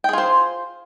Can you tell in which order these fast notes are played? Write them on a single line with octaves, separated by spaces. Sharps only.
G5 G#4 F4 C5